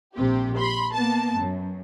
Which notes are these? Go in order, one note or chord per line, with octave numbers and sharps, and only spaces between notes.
A#1 C3 G4
B5 C6
A#3 B3 A5
F#2